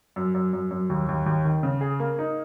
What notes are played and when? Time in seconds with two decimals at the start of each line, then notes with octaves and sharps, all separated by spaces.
0.16 F#2
0.35 F#2
0.53 F#2
0.71 F#2
0.90 D#2
1.09 D#2
1.26 D#2
1.45 D#3
1.63 C#3
1.81 G#4
2.00 A#3
2.19 D#4